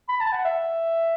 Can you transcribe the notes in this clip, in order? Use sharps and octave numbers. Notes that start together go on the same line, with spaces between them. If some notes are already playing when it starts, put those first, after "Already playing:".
B5
A5
F#5
E5